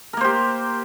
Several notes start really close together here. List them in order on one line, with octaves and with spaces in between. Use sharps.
A#4 A#3 C5 G4